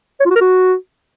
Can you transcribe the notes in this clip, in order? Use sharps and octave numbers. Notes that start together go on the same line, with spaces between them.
C#5
F4
F#4
A#4
F#4